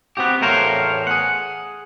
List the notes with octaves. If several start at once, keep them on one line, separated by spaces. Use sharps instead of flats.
B3 C4 F#4 G4
E2 A2 A#4 C5 C#5 F5
G#4 F#5